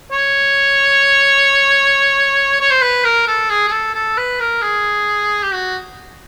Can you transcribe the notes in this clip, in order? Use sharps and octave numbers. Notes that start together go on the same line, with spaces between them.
C#5
C#5
C5
B4
A#4
A4
G#4
G#4
A4
A4
B4
A#4
G#4
G4
F#4